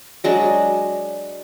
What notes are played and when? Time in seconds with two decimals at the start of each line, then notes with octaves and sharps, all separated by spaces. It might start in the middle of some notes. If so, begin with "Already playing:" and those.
0.24 F#3 G#3 D4